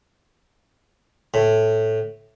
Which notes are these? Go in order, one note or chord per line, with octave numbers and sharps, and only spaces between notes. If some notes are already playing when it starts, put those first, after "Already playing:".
A2